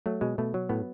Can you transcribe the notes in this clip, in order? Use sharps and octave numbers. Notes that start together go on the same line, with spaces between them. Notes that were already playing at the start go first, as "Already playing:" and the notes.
F#3 A3
B2 G#3
B2 A3
F#3
A2 B3